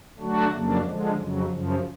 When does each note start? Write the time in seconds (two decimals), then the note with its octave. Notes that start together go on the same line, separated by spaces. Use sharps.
0.18 D3 F#3 A3 D4 F#4
0.52 F2 C#3 F#3 A#3 D4
0.84 D3 F3 G#3
1.17 F2 C#3 F#3
1.49 F#2 C#3 F3